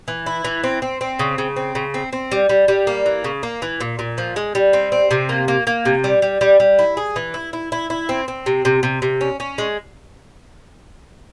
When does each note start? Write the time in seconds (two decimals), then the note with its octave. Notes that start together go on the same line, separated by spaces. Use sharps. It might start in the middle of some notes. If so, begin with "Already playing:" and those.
0.08 E3
0.26 E4
0.45 E3
0.64 C4
0.82 C4
1.01 C4
1.19 C#3
1.38 C#3
1.56 C4
1.75 C#3
1.94 C4
2.13 C4
2.32 G3
2.49 G3
2.68 G3
2.87 A#3
3.06 E3
3.24 C#3
3.43 A#3
3.62 E3
3.80 A#2
3.99 A#2
4.18 F3
4.36 G#3
4.55 G3
4.73 C4
4.92 C4
5.11 C3
5.29 A#3
5.48 A#3
5.67 A#3
5.85 C3
6.04 G3
6.22 G3
6.41 G3
6.60 G3
6.79 E4
6.97 G#4
7.16 E3
7.34 E4
7.53 E4
7.72 E4
7.90 E4
8.09 C4
8.28 C4
8.46 C3
8.65 C3
8.83 C3
9.02 C3
9.21 C#4
9.40 C#4
9.58 G#3